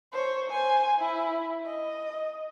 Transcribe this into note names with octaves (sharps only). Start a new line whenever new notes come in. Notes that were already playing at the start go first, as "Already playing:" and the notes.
C5 C#5
C5 G#5
E4
D#5